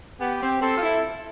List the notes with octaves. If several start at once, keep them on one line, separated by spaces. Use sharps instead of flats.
B3 G4
C4
C4 A4
F4
E4